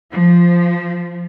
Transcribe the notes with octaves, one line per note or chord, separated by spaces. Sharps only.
F3